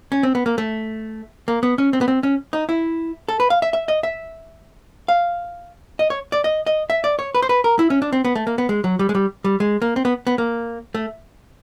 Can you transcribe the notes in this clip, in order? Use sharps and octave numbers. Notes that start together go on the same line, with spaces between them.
C#4
C4
B3
A#3
A3
A#3
B3
C#4
C4
B3
C4
C#4
D#4
E4
A4
B4
F5
E5
E5
D#5
E5
F5
D#5
C#5
D5
D#5
D#5
E5
D5
C#5
B4
C5
B4
A#4
E4
C#4
D4
C4
B3
A3
A#3
B3
G#3
F#3
G3
G#3
G3
G3
G#3
A#3
C4
B3
B3
A#3
A3